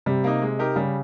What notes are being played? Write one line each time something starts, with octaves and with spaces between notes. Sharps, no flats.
C3 G3
A#3 D#4
G#3
D#4 G4 A#4
C#3 G3